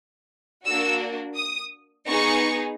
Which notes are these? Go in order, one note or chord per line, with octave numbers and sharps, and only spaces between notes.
A#3 D4 F#4 E6
D#6
B3 D#4 G#4 C#6